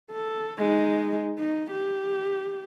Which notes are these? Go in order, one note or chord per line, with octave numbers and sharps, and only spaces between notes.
A4
G#3 D#4
D#4
G4